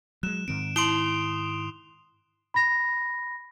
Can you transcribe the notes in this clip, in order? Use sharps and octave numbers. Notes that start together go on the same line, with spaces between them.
F#3 G#3 F#6 E7
G#2 D#3 C4 D7
E4 C6 D#6 C7 D7 F7 G7
B5 A#6